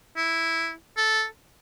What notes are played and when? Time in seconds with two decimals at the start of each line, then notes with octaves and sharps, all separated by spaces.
0.17 E4
0.97 A4